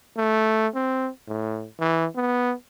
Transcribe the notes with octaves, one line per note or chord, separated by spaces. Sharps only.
A3
C4
A2
E3
B3